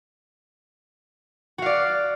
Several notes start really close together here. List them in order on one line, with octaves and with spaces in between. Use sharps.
F#4 F5 D5